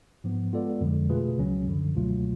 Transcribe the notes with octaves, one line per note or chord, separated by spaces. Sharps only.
G#2 F3 B3
G#3 B3 F4 A4 D5
F2 D3 F3 G#3
B2 A3 F4 G#4 B4
C#2 C#3 F#3 C#4
F#2 D3 F3
C#2 B2 F#3 A3 F4